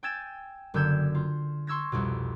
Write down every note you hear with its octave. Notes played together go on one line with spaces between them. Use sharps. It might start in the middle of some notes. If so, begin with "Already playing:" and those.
G5 G#5 E6 G#6 A6 E7
F#1 D3 E6 G6 G#6 E7
F4
C6 C#6 E6 G#6 A#6
C2 F2 B2